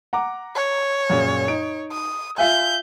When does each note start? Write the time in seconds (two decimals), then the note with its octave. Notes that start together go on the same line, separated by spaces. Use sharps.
0.13 F#5 A#5 D6
0.56 C#5
1.10 F#2 A#2 C#3
1.48 D#4 D7
1.92 D#6
2.38 F4 E5 G#5 G6